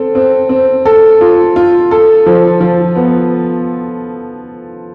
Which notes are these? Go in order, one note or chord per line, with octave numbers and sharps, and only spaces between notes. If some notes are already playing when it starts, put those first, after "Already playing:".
Already playing: C4 A4
C4
C4
A4
F4
F4
A4
F3
F3
B3